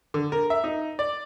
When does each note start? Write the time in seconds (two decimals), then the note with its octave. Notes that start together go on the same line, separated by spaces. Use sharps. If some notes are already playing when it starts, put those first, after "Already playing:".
0.14 D3
0.32 A#4
0.50 E5
0.64 D#4
0.99 D5